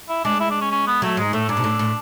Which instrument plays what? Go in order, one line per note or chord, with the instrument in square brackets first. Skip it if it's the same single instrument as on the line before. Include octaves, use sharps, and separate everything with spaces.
[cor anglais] E4
[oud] G#3 [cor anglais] D4
[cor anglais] E4
D4
C#4
C#4
B3
[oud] F#3 [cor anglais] A3
[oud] G#2 [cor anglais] G#3
[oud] A2 [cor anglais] A3
[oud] G#2 [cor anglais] D4
[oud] B2
A2
A2